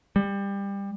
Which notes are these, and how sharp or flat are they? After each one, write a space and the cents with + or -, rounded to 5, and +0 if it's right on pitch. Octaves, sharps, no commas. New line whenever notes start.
G3 +25